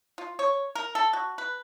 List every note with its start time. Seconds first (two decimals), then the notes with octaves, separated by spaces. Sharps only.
0.18 F4
0.39 C#5
0.75 A#4
0.95 A4
1.13 F#4
1.38 B4